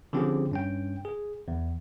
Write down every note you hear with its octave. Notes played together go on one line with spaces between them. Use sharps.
D3 F3 C4 C#4 G4 G#4
G2 C#4 G5
G#4
E2